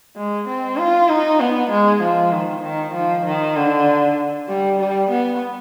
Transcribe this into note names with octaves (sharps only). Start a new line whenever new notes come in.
G#3
C4
F4
D#4
B3
G#3
F3
D#3
D#3
F3
D#3
D3
G3
G3
B3